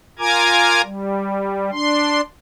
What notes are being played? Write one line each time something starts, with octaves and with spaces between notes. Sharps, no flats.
F4 A#4 G#5 A#5 D6 G#6
G3
D4 C6